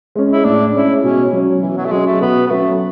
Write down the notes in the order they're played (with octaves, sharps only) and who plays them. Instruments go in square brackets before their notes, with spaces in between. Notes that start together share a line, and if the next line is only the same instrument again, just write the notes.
[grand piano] G#3 C#4
[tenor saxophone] E4
[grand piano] A2 [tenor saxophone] D4
[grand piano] G#3 C#4 [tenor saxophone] E4
[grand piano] B2 [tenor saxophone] C#4
[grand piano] F#3 C#4
[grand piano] B2 [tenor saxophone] E3
[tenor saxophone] F#3
A3
[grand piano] F#3 C#4 [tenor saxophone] G#3
[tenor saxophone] A3
[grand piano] B2 [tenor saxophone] B3
[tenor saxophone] B3
[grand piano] F#3 C#4 [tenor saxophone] A3